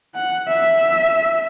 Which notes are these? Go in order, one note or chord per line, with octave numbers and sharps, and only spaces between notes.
F#5
E5